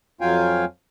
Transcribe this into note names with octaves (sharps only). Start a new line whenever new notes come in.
F2 F#3 F4 F5 G5 G#5